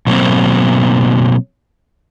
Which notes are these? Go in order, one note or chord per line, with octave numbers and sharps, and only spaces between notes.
B2 F#3 A#3 C4